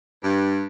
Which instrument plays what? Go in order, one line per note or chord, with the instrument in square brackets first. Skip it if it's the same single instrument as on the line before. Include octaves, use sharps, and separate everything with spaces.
[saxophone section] G2